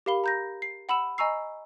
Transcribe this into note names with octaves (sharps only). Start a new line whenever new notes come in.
G4 A#4 F5 B5 G7
A#5 G6 A#6
C7
F#5 B5 E6 E7
D#5 G#5 A#5 C#6 E6 C7